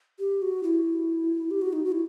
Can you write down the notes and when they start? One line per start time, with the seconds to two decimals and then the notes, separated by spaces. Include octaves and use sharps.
0.19 G4
0.42 F#4
0.63 E4
1.51 G4
1.62 F#4
1.73 D#4
1.84 F#4
1.92 E4